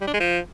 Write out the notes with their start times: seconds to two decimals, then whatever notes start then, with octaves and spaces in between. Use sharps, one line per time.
0.01 G3
0.07 D4
0.14 G#3
0.20 F3